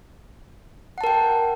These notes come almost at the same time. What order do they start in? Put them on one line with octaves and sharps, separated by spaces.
F#5 A5 A#4 G5